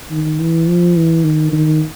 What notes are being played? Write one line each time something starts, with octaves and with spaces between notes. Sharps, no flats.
D#3
E3
F3
E3
D#3
D#3